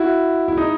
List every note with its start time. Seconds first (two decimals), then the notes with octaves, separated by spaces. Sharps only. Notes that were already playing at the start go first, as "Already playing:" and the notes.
Already playing: E4 F#4
0.48 E4
0.57 D#4